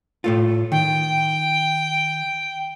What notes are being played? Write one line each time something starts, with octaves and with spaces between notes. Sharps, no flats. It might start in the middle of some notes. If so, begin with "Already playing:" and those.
A2 A3 F4
D#3 G5